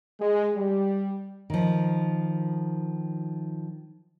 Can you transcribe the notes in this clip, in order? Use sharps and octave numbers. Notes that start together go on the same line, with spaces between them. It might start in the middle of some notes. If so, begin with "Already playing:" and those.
G#3
G3
D#3 F3